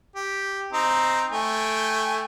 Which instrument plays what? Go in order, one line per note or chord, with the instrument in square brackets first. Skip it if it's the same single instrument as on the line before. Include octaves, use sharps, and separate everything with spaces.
[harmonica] G4
C4 D#4 A#5
A3 G5 G#5